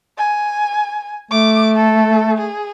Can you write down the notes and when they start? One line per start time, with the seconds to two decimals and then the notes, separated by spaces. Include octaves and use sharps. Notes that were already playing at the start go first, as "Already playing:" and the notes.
0.18 G#5
1.31 A3 D6
1.76 A4
2.38 G#4